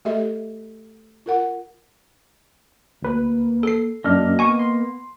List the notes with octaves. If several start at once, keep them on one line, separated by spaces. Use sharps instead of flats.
A3 G4 A4 D#5 E5
F4 A#4 F#5
D2 A#3 B4
A4 C7
F#2 A#3 D4 D#5 F6
B3 G#5 C#6
C6